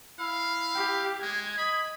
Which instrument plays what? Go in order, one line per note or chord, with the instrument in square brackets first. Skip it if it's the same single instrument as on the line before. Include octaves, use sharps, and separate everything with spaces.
[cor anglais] E4 [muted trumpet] F5
[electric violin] G4
[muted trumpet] G#3 [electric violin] G#6
[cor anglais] D#5 [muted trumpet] B5